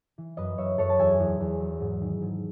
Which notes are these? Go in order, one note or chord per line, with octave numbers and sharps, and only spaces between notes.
E3
F#2 B4 D#5
F#2 C#5 E5
F#2 A4 C#5
A5
E2 E5 G#5
E2
E2
F#3
G#2
D#3
G#2